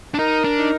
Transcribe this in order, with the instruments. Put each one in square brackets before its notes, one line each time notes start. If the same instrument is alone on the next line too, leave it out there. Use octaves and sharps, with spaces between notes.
[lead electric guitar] D4
[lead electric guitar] D#4 [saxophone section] A#4
[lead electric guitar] D4
[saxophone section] D#4